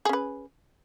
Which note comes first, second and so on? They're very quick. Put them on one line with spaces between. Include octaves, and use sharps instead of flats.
G#4 C#4 B4